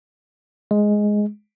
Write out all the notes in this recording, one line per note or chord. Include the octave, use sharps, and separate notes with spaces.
G#3